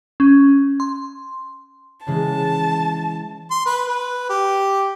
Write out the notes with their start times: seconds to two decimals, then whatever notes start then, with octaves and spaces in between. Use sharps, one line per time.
0.20 C#4
0.80 C6
2.07 C#3 E3 G#3 A5
3.51 C6
3.66 B4
3.88 B4
4.30 G4